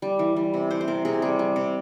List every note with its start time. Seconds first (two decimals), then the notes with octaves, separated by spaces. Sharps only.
0.02 G3
0.19 E3
0.36 G3
0.54 C3
0.71 C3 C5
0.81 C5
0.87 C3 A#4
1.05 C3 G#4
1.22 G3 G#4
1.39 G3
1.56 C3